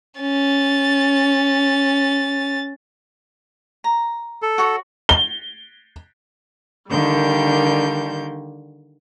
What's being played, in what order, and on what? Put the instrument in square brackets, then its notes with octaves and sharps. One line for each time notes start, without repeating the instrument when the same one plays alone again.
[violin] C#4 A6
[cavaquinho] A#5
[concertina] A4
[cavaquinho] F#4 C#5
[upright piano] G7
[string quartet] D3 D#3 G3 A#3 G6